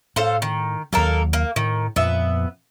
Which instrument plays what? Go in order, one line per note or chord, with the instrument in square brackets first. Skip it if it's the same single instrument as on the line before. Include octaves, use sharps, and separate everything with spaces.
[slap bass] A2 [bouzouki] A4 C5 F5
[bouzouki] D#3
[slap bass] D#2 F#3 [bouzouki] A#3 A4 A#4
[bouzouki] A#3
[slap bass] A2 [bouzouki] D#3
[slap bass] F2 A#2 F3 [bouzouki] B3 E5